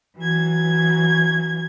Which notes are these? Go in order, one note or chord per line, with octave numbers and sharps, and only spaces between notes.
E3 F#3 G#6